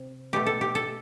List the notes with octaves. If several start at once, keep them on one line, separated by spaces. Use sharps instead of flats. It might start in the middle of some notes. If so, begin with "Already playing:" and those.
Already playing: C3
B2 A3 G4
A4
G4
A4